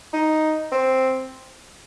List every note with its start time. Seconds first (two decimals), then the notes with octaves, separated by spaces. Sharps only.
0.13 D#4
0.72 C4